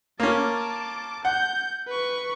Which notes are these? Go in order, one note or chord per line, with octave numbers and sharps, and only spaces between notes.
A#3 C#4 A5 D6
F#5 G6
B4 C#6